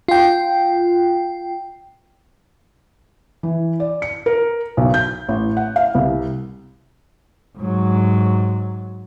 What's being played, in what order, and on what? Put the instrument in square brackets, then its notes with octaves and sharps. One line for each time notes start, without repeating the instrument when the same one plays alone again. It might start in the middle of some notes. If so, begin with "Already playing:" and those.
[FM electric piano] F4 G5
[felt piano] E3
D5
C#7
A#4
B1
G6
A1
F#5
F5
C2
[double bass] G#2 F#3